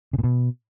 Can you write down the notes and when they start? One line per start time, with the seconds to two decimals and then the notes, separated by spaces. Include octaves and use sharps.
0.13 C#3
0.19 A#2
0.24 B2